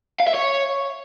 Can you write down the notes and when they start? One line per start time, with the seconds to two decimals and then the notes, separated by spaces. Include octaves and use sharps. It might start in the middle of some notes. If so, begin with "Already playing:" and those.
0.20 F5
0.27 E5
0.34 C#5